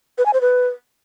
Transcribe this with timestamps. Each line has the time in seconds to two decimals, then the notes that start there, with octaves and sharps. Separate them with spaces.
0.18 B4
0.26 G#5
0.33 C5
0.41 B4